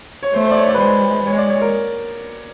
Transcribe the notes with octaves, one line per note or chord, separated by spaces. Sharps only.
C#5
A3 C5
C5
D5
C#5
D5
B4
G#3 C5
G#3 C#5
D5
C#5
A#4